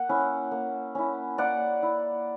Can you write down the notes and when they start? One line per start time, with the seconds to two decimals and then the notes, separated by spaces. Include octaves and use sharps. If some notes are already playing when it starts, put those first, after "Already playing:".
Already playing: A#3 F#5
0.09 C#4 E4
0.51 A#3
0.95 C#4 E4
1.38 A#3 D5 F#5
1.83 E4